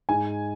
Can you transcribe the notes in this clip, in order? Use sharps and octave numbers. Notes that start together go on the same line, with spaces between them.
G#2 G#5